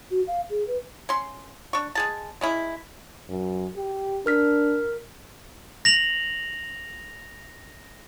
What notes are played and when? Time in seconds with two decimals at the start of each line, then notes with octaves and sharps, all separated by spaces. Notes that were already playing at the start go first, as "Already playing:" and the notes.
0.11 F#4
0.27 F5
0.50 G#4
0.67 B4
1.09 C#4 C6
1.73 D4 C#6
1.95 G#3 G#4 A5
2.41 G#3 C#4 E4
3.29 F#2
3.76 G4
4.26 D4 A#4 F6 B6
5.85 A#6 F7 F#7